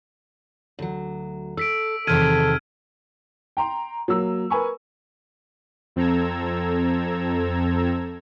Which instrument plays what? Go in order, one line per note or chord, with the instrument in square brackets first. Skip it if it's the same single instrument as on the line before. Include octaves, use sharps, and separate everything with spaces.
[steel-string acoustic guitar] D2 F#3
[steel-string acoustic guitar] A4 [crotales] E6 B6 D7
[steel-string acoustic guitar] E2 C3 D#3 [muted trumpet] A4 [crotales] F6 G#6 D#7
[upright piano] G5 A#5 C6
F#3 A#3 E6
A#4 B4 G#5 B5 C#6
[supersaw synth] F2 C4 A4 A#5 E6 G#6